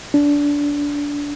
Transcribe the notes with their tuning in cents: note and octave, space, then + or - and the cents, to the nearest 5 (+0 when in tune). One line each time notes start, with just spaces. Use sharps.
D4 -20